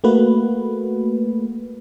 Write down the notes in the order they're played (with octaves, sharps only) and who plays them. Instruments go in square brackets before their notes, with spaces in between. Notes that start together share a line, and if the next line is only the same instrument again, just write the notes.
[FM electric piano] A3 A#3 F#4 B4